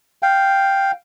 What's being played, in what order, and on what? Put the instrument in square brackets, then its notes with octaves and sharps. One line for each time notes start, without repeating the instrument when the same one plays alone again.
[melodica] F5 G5